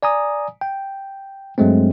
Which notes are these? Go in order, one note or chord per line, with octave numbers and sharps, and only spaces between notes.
D5 G#5 A#5 D#6
G5
G2 F#3 G#3 A3 C4